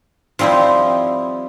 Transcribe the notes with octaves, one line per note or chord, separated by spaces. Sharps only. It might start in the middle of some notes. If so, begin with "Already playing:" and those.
F3 G3 C4 D#4 E4